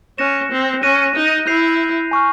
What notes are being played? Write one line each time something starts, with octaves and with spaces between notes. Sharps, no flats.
C#4 F#6 A#6 C#7 E7
C4
C#4 F#6 A#6 D#7
D#4
E4 G6 C7 F7
G#5 C#6 F6